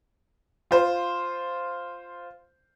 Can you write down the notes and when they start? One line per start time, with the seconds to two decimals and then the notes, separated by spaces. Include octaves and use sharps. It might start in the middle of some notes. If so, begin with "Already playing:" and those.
0.71 F4 C5